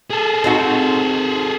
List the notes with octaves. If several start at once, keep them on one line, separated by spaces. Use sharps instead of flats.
G#4 A4
C4 D#4 F#4